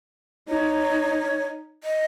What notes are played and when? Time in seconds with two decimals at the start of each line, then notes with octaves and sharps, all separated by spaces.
0.48 D#4 C#5
1.84 D#5